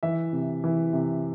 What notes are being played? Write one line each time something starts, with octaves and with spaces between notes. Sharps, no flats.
E3 E5
C3
E3
C3